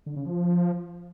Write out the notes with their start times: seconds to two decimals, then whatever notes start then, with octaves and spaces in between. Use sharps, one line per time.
0.06 D3
0.16 C#3
0.26 F3